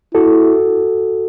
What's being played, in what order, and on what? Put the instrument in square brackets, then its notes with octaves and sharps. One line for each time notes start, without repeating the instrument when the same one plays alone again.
[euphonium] E4 [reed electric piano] F#4 A4